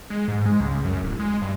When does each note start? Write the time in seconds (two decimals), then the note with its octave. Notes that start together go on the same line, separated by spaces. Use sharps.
0.10 G#3
0.28 G#2
0.46 G#3
0.61 C#2
0.85 F#2
1.03 D1
1.19 G#3
1.42 G2